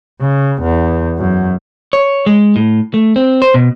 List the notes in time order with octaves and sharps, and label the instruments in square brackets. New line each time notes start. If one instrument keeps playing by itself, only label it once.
[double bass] C#3
E2
F#2
[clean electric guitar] C#5
G#3
A2
A3
C4
C5
B2